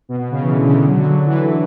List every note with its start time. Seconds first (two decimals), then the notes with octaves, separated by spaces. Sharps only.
0.09 B2
0.20 B2
0.31 C#3
0.42 E3
0.53 D3
0.65 C#3
0.76 D3
0.87 F#3
0.98 D3
1.09 F#3
1.26 E3